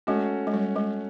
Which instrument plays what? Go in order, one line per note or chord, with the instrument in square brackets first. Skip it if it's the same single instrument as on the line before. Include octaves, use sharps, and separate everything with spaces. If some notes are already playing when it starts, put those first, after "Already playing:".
[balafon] G#3 [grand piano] A3 C#4 F#4
[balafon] G#3
G3
G#3